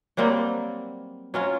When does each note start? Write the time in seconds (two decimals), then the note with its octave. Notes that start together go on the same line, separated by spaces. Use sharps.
0.17 F#3 G3 A#3 C4
1.34 F#3 C#4 F4